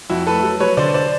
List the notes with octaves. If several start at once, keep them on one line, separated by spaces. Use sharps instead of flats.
F2 E4 F#4
A3 A4 B4
F#3
F#3 B4 C#5
D3 C5 D5
C5 D5